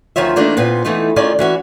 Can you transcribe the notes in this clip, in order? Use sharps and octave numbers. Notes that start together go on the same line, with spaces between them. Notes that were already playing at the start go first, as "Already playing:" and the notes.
D2 D#3 F3 F4 C#5 E5
E3 A3 A#3 D4 D#4 F4
A#2 B3 C4
E3 A3 B3 D#4 F4
D#3 C#4 F4 G#4 D5 D#5
E3 C#4 F#4